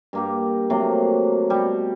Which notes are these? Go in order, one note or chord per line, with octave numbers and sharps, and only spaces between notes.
G2 A#3 G4
C3 F#3 A3 A#3
B2 G3